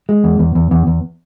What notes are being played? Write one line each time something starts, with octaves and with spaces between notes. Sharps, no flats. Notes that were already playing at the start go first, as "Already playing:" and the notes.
G#3
E2
E2
E2
E2
E2